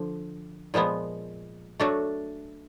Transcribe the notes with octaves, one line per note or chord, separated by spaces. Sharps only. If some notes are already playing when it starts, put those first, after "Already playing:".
Already playing: D3 F3
A#2 F3 G#3 B3
F#3 A3 D4 F#4 A4